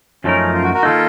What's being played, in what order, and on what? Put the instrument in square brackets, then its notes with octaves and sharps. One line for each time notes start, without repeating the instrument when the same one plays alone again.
[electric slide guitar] F#2 F3 A3 D#4 A#4 [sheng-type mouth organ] C#4
[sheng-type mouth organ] F4
F#4
F#4 A#4
[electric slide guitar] D#3 A#3 D#4 [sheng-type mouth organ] F4 A4